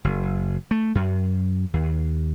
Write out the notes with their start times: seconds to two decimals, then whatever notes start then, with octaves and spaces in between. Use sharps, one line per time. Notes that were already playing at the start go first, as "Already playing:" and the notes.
0.04 F#1
0.71 A3
0.95 F#2
1.74 D#2